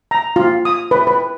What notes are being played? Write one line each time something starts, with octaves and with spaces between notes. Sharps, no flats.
A#5
F4
D#6
B4
B4